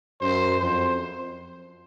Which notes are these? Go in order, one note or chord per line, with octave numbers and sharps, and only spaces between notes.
F#2 C5
F2 C5